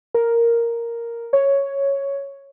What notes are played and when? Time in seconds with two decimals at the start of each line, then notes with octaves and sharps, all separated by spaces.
0.14 A#4
1.33 C#5